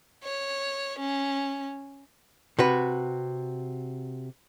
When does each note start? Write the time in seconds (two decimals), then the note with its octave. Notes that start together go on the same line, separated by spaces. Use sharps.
0.24 C#5
0.99 C#4
2.59 C3 F#4 B4